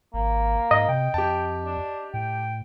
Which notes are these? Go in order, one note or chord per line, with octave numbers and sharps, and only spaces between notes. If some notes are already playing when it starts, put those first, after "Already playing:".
G#1 A#3
G#2 D#5
C3 G5
F2 G4 A5
D4
A2 G5